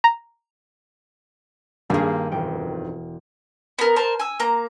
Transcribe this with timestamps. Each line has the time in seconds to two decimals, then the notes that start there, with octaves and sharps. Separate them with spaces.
0.04 A#5
1.90 G2 D#3 A#3 G#4
2.32 E1 F2 G5
3.79 B3 A#4
3.96 A#4 C5 A5
4.20 G#5 E6
4.40 A#3 A#5